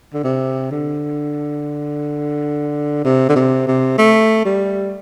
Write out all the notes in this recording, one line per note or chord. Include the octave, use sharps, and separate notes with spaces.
D3
C3
D3
C3
D3
C3
C3
A3
G3